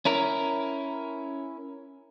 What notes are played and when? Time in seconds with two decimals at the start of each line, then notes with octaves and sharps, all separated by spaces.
0.05 C#4 E4 A#4